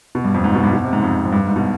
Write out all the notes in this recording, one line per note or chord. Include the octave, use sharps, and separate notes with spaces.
B2
G2
F2
G#2
B2
G2
B2
C3
G#2
F2
F2
G2
G#2
B2